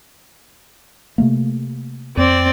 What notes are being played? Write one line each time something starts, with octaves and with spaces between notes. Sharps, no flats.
C3 A3 A#3
F2 C4 D5